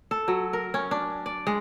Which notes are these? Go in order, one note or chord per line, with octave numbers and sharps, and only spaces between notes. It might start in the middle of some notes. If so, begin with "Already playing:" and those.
A4
F#3
A#4
C#4
D4
D5
G#3